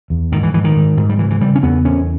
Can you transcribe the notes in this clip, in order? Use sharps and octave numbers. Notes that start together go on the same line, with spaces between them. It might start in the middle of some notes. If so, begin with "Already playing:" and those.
E2
G#2 D#3
E3
G#2 E3
D#3
G#2
G#2
G3
C#3 E3
E3
C#3 G3
C#4
E2 B3
E2 C#4